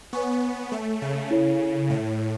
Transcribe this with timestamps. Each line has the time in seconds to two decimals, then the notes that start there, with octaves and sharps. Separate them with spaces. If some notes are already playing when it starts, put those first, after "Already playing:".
0.13 B3 C#5 G#5 C#6
0.72 A3
1.02 C#3
1.31 E4 A4 C#5
1.90 A2